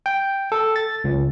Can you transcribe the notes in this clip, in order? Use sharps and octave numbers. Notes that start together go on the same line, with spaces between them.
G5
A4
A6
C#2